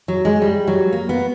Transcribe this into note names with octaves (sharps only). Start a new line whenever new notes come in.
F#3
G#3
G3
F#3
A#3
B3